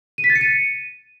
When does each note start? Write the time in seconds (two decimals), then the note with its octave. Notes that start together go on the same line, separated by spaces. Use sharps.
0.18 D#7
0.24 B6
0.30 A6
0.35 C#7
0.41 D#7